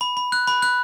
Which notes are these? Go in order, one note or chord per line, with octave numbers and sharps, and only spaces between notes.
B5
B5
F#6
B5
F#6